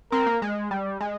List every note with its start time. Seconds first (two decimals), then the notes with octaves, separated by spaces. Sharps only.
0.12 C4 A#4
0.26 A#3
0.42 G#3
0.71 G3
1.01 G#3